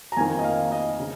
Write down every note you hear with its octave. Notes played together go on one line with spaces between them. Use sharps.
A#5
F2 D#3 A#3 G#5
D#5
F5
D#5
C#3